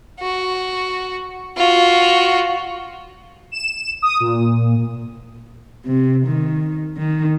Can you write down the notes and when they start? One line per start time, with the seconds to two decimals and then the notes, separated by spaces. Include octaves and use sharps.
0.20 F#4
1.57 F4 F#4
3.52 E7
4.02 D#6
4.20 A#2
5.85 C3
6.26 D#3
6.97 D#3